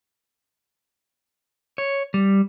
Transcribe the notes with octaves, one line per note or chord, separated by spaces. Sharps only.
C#5
G3